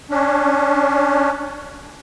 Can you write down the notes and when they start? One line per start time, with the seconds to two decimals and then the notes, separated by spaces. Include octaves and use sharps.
0.11 C#4 D4